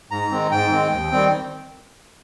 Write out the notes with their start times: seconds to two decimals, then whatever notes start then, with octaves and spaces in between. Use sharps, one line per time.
0.11 G#2 A#5
0.31 D#3 G#3 C4
0.51 G#2 G5
0.72 D#3 G#3 C4
0.93 D#2
1.12 D#3 G3 C4